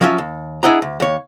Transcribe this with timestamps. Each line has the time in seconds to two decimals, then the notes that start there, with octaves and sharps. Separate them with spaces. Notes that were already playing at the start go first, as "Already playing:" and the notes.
0.01 F3 F#3 C#4 F4 D#5 E5
0.18 D#2
0.63 D4 E4 G#4 D#5 F#5 A#5
0.82 D2
1.00 D#2 C#5